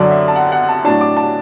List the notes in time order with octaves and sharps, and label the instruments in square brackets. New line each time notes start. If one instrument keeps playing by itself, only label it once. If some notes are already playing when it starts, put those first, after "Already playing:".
Already playing: [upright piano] F#2 D3 F#3 D5
E5
A5
F#5
F#5
A5
A2 F#3 D4 A5
D6
A5